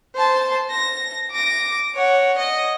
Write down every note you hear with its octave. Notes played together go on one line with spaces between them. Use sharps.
C5 A5
A#6
D6 A#6
C#5 F#5
D#5